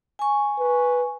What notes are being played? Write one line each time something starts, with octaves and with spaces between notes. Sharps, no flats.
G#5 C#6
B4